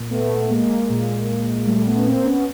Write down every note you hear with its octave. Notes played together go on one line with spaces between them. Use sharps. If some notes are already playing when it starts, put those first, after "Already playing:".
Already playing: A#2
A3 B3
G#3 A#3
A#2
G3 A3
A3 B3
C#4
A#3 C4
B3 C#4